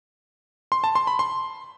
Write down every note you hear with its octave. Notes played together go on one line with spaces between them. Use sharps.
C6
A5
C6
B5
C6